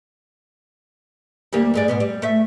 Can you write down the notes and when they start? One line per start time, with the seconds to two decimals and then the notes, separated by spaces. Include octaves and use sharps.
1.52 D2 G3 A#3
1.74 G2 G#3 D5
1.88 G#2 B2 B3
2.00 G3
2.22 A3 E5